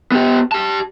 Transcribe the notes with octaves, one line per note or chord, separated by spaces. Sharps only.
B3 G4
G4 A5